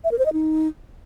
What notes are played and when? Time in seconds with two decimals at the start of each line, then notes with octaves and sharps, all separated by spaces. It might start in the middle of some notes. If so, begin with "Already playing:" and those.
0.04 E5
0.11 A#4
0.19 C5
0.26 D#5
0.33 D#4